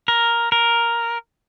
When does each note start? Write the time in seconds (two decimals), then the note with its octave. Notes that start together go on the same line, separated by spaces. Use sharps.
0.08 A#4
0.52 A#4